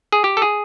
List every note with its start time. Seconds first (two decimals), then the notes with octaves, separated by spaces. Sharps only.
0.12 G#4
0.24 G4
0.37 A4
0.42 G#4